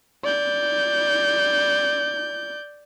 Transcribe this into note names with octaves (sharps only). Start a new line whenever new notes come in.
D5 G6